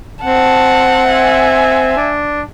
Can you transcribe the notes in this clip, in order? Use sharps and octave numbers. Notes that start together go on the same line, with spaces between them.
C4 F#5 A5
E5 G#5
D4